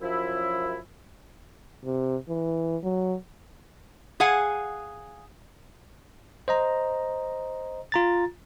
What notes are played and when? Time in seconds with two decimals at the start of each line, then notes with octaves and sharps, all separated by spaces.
0.01 F#2 F3 E4
1.85 C3
2.29 E3
2.83 F#3
4.20 G#4 F5 F#5 G#5
6.48 C5 D#5 A#5
7.92 F4 A#5 A6